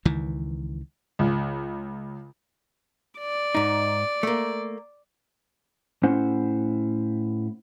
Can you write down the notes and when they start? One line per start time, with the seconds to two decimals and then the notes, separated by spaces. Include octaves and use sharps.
0.05 C#2 D#3 E3
1.19 C#2
3.19 D5
3.55 G#2 D#4
4.23 A3 A#3
6.03 A2 C#4 E4 C5 F#5